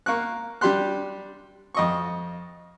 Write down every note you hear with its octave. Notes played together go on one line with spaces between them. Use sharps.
A#3 C#6 F#6
G3 D4 G4 C6 F#6
F2 D#5 C#6